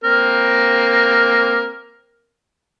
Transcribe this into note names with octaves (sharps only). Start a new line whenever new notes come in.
A#3 C4 A#4